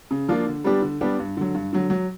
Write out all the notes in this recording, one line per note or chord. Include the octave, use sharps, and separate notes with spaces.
C#3
F3 A#3 D4 F4
D3
G3 B3 D4 G4
D3
G3 B3 D4 G4
G2
D3 F#3
G2
D3 F#3
F#3